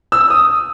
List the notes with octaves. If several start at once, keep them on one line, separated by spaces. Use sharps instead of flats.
E6
D#6